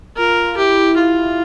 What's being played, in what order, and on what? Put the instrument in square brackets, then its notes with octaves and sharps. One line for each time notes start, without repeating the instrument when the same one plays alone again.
[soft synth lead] F4 [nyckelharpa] A#4
[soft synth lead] E4 [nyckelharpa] G4
[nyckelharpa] F4